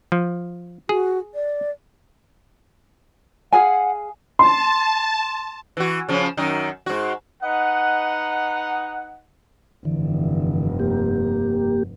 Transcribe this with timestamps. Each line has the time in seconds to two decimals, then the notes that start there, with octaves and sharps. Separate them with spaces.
0.12 F3
0.89 F#4 G#4
1.35 D5
3.53 G#4 F5 F#5 G#5
4.39 A5 C6
5.77 E3 F#4
6.09 C#3 F3 C#4
6.37 F#2 D#3 D#4
6.86 G#2 F#4
7.43 D#4 B4 D#5 F#5
9.85 F1 G2 D3 E3
10.80 A#3 G4